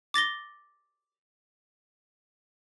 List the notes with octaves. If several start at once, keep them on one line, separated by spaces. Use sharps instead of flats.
D6 A6 A#6 G7